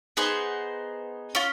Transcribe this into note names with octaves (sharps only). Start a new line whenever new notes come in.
B3 D#4 G#4 C5
C#4 F4